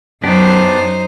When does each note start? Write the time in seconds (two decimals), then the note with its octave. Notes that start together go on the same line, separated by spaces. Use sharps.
0.24 F#2 B3 D4 D#4 G4 C5